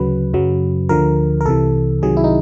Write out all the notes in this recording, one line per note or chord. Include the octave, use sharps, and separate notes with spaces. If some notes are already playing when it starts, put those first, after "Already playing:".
Already playing: D2 C#3 F#3 B4
F#2 C#3 F#3
D2 D3 F3 A#4
A#4
C2 C3 E3 A4
C2 C3 D#3 F#3 G#4
E4
D#4